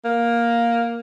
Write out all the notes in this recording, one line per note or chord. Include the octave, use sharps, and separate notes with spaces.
A#3